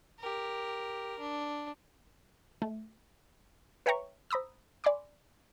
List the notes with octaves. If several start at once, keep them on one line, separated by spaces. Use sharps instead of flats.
G4 A#4
D4
A3
B4 C#5 E5 G5 A#5 C#6
C5 A#5 B5 D#6 E6
D5 G#5 B5 C6 D6